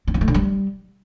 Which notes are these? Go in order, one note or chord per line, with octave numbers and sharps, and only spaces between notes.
C4
B3
A3
D3
G3